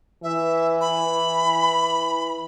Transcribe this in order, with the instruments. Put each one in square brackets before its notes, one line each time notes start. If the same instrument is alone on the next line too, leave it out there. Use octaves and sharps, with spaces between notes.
[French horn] E3 [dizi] E5
[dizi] B5